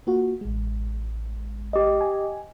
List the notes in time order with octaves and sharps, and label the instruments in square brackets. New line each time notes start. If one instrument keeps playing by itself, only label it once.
[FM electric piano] A#3 F4 F#4
A1 G#3
[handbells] G4 D#5
[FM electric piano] G#5